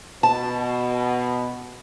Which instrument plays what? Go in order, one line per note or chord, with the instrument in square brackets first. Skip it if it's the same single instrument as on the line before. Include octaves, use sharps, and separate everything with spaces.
[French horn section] B2 [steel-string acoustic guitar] A5